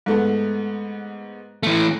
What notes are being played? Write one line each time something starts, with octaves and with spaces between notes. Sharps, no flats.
G#2 A3 B3
E3 A3